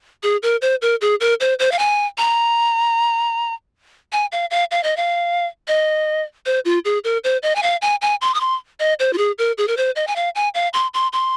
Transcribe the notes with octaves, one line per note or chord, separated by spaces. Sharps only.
G#4
A#4
C5
A#4
G#4
A#4
C5
C5
F5
G#5
A#5
G#5
F5
F5
F5
D#5
F5
D#5
C5
F4
G#4
A#4
C5
D#5
G#5
F5
G#5
G#5
C6
D#6
C6
D#5
C5
F4
G#4
A#4
G#4
A#4
C5
D#5
G#5
F5
G#5
F5
C6
C6
C6